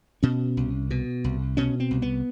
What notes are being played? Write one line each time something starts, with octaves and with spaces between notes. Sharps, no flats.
B2 C#4
C2
B2
C2
B2 C#4
C4
C2
B3